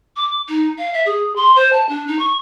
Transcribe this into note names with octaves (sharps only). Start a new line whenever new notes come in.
D6
D#4
F5
E5
G#4
C6
C5
A5
D4
D#4
C#6